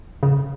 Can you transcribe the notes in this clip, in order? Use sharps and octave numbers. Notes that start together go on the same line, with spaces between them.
C#3